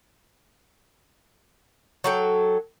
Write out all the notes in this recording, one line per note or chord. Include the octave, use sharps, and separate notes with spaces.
F#3 A4 G5